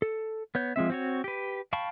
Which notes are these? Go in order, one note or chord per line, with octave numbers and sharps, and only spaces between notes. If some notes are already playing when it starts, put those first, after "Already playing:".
A4
B3 C#5 G6
F3 G#3 C4 E5
C4 F#4 C#5
G4 B4
F5 G5 A5 B5 C#6